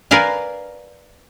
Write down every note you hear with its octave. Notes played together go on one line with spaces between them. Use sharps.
A#4 B4 D5 F5 G#5